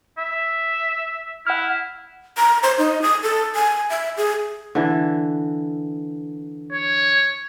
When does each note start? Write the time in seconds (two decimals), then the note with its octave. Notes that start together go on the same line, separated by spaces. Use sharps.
0.18 E5
1.47 E4 F#5 F6
2.37 A#5
2.63 C5
2.78 D#4
3.02 D#6
3.23 A4
3.55 G#5
3.90 E5
4.17 G#4
4.75 D3 E3
6.73 C#5